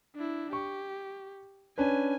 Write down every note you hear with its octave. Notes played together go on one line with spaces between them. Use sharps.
D4 E4
G4 C#6
C#4 D4 B4 G#5